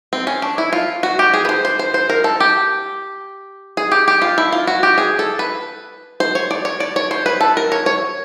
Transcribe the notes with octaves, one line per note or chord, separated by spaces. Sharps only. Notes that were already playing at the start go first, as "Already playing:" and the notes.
C4
C#4
D4
E4
F4
F#4
G4
G#4
B4
C5
C5
C5
C5
A#4
A4
G4
G#4
G4
G4
F4
E4
F4
F#4
G4
G#4
A4
B4
C5
C#5
D5
C#5
D5
C#5
C5
B4
A4
A#4
C#5
C#5